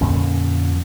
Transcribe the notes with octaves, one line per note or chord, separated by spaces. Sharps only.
F2 A#2 D3 C#4